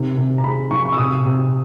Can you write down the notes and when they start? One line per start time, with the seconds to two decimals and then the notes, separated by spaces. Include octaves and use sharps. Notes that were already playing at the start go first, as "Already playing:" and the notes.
Already playing: C3 D#3
0.17 C3
0.38 A#5
0.44 G#3 B5
0.71 F3 C#6
0.85 C#6
0.92 E6
0.98 C3 D#6
1.25 C3